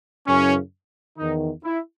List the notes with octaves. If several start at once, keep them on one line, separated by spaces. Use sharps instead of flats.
F#2 C#3 E3 C#4
E2 D#3 D#4
E4